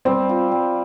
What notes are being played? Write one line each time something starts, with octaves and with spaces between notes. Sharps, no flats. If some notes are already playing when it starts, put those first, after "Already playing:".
G3 C4
F4
G3